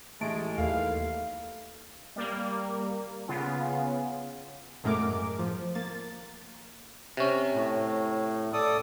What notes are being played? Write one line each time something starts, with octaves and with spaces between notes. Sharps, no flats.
A1 G#3 A3 D7
D#2 A3 A#3 B4 F5
G3 A#3
C#3 B3 F4 G#4
F#2 A2 G#3 A3 A#4 D6
F3
A#3 A6
C3 C#4
A2
A4 D5 D#6